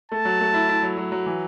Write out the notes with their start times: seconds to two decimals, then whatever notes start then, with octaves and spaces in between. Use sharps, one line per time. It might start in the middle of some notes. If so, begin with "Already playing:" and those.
0.12 A3 A5
0.25 F#3
0.41 A3
0.54 E4
0.69 E4
0.83 F#3
0.98 F#3
1.12 F#3
1.26 E3